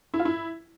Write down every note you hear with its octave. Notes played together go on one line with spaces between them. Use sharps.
E4
F4
E4